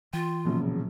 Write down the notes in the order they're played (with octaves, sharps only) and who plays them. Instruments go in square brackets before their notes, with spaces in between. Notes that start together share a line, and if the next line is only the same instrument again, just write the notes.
[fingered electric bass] E3 [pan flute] F4 [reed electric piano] G5
[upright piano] E1 A#1 C#3 [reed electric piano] A#2 F3 F#3